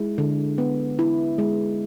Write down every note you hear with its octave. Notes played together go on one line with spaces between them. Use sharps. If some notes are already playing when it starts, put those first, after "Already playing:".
Already playing: G#3 E4
D3
B3
E4
G#3